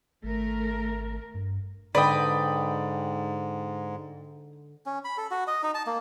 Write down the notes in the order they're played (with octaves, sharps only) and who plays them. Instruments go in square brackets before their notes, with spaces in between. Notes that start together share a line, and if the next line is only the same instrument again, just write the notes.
[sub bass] G#1 [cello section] A3 A#4
[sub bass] G2
[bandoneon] G#2 [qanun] D3 [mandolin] B4 D#5 [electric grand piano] D5 G5
[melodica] C#4
B5
A4
F#4
D#5
D#4
A5
A#3